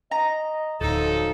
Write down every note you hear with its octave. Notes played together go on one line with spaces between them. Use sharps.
D#5 A#5
D1 F3 F#3 D#4 A4